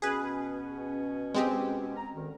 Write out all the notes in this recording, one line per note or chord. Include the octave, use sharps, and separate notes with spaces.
B2 C#4 G#4 B4
G#3 C4 G4
A#5
D2 D#3